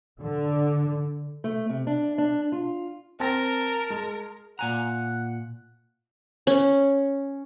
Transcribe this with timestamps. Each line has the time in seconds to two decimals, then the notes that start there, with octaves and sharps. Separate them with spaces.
0.20 D3
1.44 A3
1.69 C3
1.87 D4
2.18 D4
2.52 F4
3.20 C4 A#4 G#5 A5 A#6
3.90 G#3
4.59 A#2 F#5 G#5 A#5
6.47 C#4